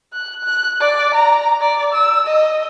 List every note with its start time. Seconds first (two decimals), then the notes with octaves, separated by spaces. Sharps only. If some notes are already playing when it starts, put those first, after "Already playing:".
0.13 F#6
0.44 F#6
0.80 D5
1.14 A#5
1.61 D5
1.93 E6
2.27 D#5